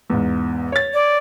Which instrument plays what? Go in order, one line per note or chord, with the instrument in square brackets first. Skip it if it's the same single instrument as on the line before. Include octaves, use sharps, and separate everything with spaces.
[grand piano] E2 G#2
C#5 A6
[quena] D5